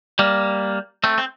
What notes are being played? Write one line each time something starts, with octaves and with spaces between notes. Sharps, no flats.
G3 A#3
A3 C4
C4